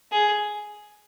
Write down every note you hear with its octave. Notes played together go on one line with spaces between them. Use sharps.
G#4